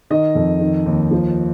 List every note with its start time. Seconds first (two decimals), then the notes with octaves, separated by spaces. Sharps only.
0.10 D#3 D#5
0.35 F2
0.61 D#3
0.86 D#2
1.11 F3